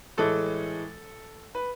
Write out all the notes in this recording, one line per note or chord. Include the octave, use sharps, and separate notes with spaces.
A2 E3 G#3 A4
B4